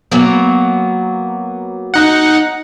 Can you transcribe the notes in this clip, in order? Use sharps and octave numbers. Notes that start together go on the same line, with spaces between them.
F#3 A#3 B3
D#4 F#5